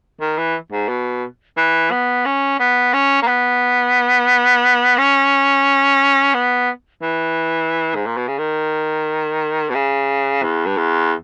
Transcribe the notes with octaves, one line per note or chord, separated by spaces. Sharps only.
D#3
E3
G#2
B2
E3
B3
C#4
B3
C#4
A#3
B3
C#4
B3
E3
G#2
A#2
B2
C#3
D#3
B2
C#3
E2
G2
E2